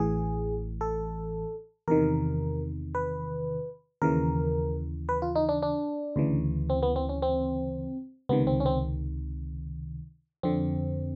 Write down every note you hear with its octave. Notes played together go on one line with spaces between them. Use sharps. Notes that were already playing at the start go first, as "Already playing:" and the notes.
Already playing: A1 A2 E3 G#4
A4
E2 C3 D#3 A#4
B4
D#2 C#3 E3 A#4
B4
F4
D#4
D4
D4
D2 C#3 E3
C4
B3
C4
C#4
C4
C#2 C3 D#3 B3
C4
C#4
C4
F2 D3 C4